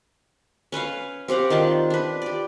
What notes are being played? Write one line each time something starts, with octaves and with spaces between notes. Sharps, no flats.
C#4 B4 C#5 F5
C4 G4 F5 F#5
D#3 D4 F4 A5
D4 B4
G4 D5